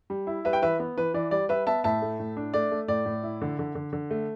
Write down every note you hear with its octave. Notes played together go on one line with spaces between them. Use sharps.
G3
E4
G3 B4 E5
G5
E3 B4 E5
B3
E3 B4
E3 D5
G3 D5
G3 B4 E5
B3 E5 A5
A2 E5 A5
A3
A2
D4
A3 D5
A3
A2 D5
A2
E4
D3
D3
D3
D3
A3